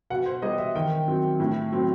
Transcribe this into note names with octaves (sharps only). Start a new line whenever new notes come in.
B2 F#5
C5
G3 B3 D#5
E5
D#3 G5
F#3 C4
A2
F#3 C4